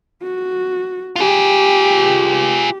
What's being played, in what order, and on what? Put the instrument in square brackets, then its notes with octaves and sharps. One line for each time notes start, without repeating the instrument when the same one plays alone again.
[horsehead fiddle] F#4
[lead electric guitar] F4 G#4 [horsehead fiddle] G4